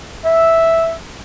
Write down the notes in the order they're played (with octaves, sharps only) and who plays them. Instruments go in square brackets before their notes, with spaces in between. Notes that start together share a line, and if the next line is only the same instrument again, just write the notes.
[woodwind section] E5